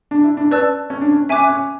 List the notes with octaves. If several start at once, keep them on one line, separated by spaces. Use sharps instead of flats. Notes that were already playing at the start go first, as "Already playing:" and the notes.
D4
E4
D4
C#4 B4 D5 A5 E6
C#4
D4
C#4
C#4 E5 G#5 D6 F#6
C#4